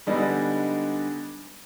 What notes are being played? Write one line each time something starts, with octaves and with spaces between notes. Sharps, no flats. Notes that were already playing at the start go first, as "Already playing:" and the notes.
D3 G3 G#3 B3 D4 D#4